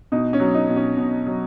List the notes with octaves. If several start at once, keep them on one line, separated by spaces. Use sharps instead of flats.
B2 D#4
C#4
F#3
D#4
B2
C#4
B2
F#3